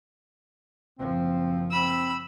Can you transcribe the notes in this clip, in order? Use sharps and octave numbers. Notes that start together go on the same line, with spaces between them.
F#1 F3 C4
C4 B5 E6